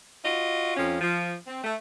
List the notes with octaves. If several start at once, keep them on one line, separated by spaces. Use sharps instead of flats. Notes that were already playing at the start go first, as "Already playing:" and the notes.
F4 F#4 D#5
F2 F3 C#4
F3
C4
A3